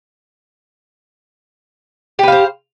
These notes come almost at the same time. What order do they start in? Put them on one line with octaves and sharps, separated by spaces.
G4 B4 F5 C5